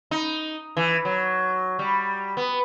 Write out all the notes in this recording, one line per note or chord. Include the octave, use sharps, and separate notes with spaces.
D#4
E3
F#3
G3
B3